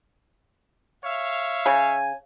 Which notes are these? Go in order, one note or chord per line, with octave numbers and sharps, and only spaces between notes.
C#5 E5 F5
C#3 G#5